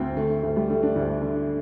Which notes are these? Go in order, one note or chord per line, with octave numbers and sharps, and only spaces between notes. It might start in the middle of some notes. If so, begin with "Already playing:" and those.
Already playing: D2 C4
D3 A3
D2 A3
G3
D3 A3
D4
D2
D3